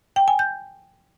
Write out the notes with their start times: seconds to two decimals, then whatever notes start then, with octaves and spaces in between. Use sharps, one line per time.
0.16 G5
0.28 G#5
0.39 G6